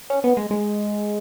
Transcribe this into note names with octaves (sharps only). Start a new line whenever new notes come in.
C#4
B3
G#3
G#3